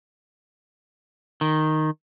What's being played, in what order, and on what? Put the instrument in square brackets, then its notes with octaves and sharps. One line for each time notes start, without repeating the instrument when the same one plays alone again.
[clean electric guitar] D#3